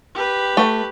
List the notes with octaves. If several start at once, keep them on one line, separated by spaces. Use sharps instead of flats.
G4 B4
A3